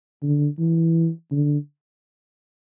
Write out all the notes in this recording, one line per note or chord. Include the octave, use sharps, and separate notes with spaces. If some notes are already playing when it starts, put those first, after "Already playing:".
D3
E3
D3